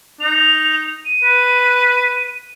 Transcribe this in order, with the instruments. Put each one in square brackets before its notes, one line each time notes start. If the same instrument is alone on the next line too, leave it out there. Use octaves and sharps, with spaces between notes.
[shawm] D#4 [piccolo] F7
[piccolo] D#7
[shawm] B4